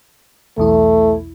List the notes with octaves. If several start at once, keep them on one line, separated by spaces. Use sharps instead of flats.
B1 E2 A3 E4